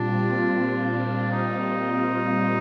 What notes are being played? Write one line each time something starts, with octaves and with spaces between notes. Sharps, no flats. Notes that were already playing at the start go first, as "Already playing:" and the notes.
Already playing: A#2 G3 C4 D4 F4
D#4